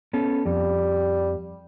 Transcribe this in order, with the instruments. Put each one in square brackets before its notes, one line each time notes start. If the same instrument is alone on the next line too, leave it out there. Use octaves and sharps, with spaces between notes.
[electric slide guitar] B3 C#4 A4
[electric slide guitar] F2 [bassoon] G3